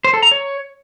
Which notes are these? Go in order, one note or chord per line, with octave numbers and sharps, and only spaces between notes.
C5
A4
A#5
C#5